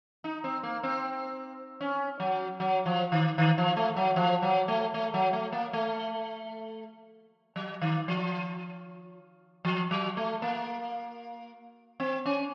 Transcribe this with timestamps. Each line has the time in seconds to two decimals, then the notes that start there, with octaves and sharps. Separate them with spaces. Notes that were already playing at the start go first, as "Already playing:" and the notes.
0.24 D#4
0.44 C4
0.63 A#3
0.83 C4
1.81 C#4
2.20 F#3
2.60 F#3
2.86 F3
3.12 D#3
3.38 D#3
3.58 F3
3.76 A3
3.96 F#3
4.16 F3
4.42 F#3
4.68 A3
4.94 A3
5.14 F#3
5.33 A3
5.52 A#3
5.73 A3
7.56 F#3
7.81 D#3
8.08 F3
9.65 F3
9.91 F#3
10.17 A3
10.42 A#3
12.00 C4
12.25 C#4